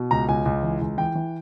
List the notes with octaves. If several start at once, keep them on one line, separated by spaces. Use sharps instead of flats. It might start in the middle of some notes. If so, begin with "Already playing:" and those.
Already playing: B2
C#2 A#5
C#2 G#5
C#2
E3
C#2
E3 G5
E3